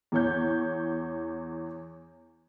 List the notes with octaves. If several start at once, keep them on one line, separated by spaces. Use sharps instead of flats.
E2 C#5 G6